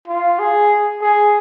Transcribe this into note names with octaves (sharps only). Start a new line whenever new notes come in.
F4
G#4
G#4